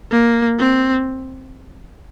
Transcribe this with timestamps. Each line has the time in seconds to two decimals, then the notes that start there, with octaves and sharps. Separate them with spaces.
0.12 A#3
0.59 C4